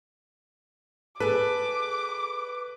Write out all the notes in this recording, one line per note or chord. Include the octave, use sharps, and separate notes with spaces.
G#4 A4 B4 D6